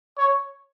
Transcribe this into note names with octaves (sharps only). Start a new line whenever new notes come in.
C#5